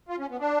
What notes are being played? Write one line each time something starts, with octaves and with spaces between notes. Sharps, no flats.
F4
C#4
B3
D4